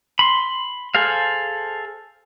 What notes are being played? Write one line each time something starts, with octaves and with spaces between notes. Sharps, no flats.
B5 C6
G#4 A4 C5 F5